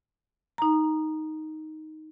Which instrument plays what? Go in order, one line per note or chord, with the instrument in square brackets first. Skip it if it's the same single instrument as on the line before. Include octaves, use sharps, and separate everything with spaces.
[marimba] D#4 A#5